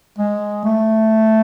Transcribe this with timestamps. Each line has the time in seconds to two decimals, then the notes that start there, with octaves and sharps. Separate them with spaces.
0.18 G#3
0.65 A3